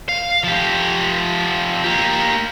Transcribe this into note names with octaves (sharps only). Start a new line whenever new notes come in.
F5
F3 G4
A#3 G4